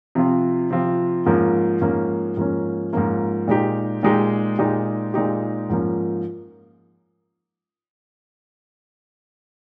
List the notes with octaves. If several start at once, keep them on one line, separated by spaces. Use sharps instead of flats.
C3 F3 C4 F4
C3 F3 C4 F4
G#2 F3 A#3 C#4
G#2 F3 A#3 C#4
G#2 F3 A#3 C#4
G#2 F3 A#3 C#4
A#2 G#3 D#4 G4
A#2 G#3 D#4 G4
A#2 G#3 D#4 G4
A#2 G#3 D#4 G4
G#2 F3 A#3 C#4